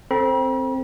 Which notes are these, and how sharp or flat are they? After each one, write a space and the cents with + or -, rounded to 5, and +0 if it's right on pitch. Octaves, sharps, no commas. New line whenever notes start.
C4 +0 A4 +0 B5 -45